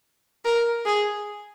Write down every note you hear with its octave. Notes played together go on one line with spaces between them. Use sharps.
A#4
G#4